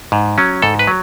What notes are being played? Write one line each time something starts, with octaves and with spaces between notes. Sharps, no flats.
G#2
F#3 C#4
G#2 A4
B4
F#3